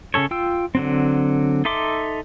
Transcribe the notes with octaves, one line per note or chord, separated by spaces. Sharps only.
C#3 C#4 A4 C#5
F4 G5 E6
D3 F#3 C4
D#4 A4 E5 C6 D6